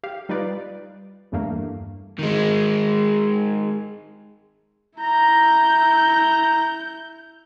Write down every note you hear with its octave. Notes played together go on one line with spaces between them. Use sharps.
G4 F5
G3 D#4 F4 B4 D5
E2 G2 A3 A#3
D#3 G#3
E4 A#5 G6